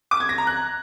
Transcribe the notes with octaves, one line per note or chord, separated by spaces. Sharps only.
D6
G#6
A#6
A#5
F#6